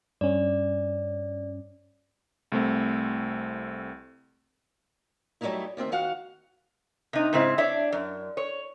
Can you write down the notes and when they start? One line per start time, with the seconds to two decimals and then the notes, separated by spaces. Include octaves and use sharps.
0.21 G2 C#4 D5
2.52 C2 A3 C4
5.41 F#3 G3 A3 A#3 D#4 E4
5.77 D2 D#3 C4 E5
5.92 D#3 F#4 F5 F#5
7.13 C3 D#4
7.33 G#2 C#3 C4 E4
7.58 D4 C#5 D5 E5
7.92 F#2
8.37 C#5